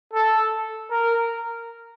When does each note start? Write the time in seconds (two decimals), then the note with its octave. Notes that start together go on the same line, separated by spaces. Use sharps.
0.13 A4
0.91 A#4